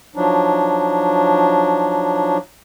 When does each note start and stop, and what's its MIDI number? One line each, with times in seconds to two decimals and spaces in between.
0.16 2.38 53
0.16 2.38 54
0.16 2.38 62
0.16 2.38 63